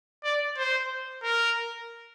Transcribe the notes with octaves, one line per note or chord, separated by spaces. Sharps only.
D5
C5
A#4